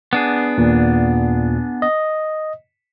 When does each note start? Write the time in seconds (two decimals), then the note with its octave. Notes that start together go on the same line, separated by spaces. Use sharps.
0.13 B3 D4 G#4
0.58 D#2 A#2
1.82 D#5